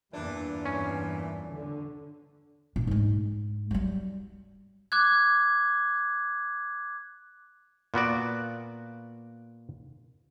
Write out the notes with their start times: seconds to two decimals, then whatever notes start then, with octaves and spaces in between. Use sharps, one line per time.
0.13 E2 G2 A#2 E3 D4
0.65 C#4
1.49 D3
2.76 A#2 D4
2.87 G#2 G#3
3.71 F#3 G3
4.92 D6 F#6 G#6
7.94 A#2 B3 F#4 D5